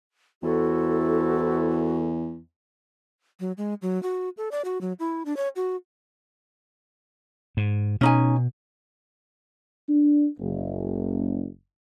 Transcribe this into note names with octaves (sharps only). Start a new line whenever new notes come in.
E2 C3 E4 F#4 A4
F#3
G#3
F#3
F#4
A4
D5
F#4
F#3
E4
D4
C#5
F#4
G#2
B2 C#4 D#4 G#5
D4
F#1